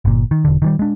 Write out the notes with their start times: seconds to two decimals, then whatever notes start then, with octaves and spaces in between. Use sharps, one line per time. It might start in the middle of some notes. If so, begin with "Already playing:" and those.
0.05 G1 A#2
0.31 D#3
0.45 E1 D3
0.62 D#3 E3 G3
0.79 G#3 D4